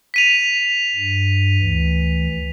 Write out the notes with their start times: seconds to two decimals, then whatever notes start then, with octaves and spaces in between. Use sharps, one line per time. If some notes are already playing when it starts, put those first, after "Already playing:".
0.14 B6 D#7 F7
0.95 G2
1.59 D2 E3